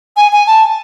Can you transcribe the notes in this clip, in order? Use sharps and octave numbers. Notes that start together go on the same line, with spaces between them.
G#5
G#5
A5